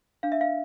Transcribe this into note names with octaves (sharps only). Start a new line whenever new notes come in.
D4 F5
E5
F5